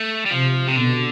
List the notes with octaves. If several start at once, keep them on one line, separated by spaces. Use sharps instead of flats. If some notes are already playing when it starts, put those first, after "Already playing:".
Already playing: A3
G3
C3 F3
C3
B2 D3